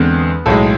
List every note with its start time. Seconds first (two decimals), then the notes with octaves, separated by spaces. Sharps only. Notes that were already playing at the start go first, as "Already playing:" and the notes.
Already playing: E2 D3 G#3 B3 C4
0.46 B1 A2 G#3 A4